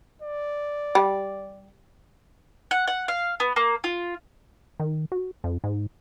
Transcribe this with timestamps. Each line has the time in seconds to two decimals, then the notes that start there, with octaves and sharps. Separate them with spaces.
0.22 D5
0.95 G3
2.71 F#5
2.88 F#5
3.08 F5
3.40 B3
3.56 A#3
3.84 F4
4.80 D#3
5.12 F#4
5.44 F2
5.64 G#2